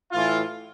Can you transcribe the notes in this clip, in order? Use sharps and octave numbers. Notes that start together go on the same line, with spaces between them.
A2 E3 F4